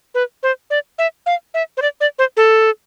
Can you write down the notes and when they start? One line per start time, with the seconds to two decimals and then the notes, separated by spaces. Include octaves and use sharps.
0.15 B4
0.43 C5
0.70 D5
0.98 E5
1.26 F5
1.54 E5
1.77 C5
1.82 D5
2.01 D5
2.19 C5
2.37 A4